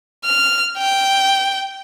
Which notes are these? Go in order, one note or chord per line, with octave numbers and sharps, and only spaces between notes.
F6
G5